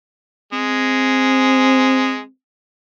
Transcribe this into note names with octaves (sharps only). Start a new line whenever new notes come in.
G#3 C4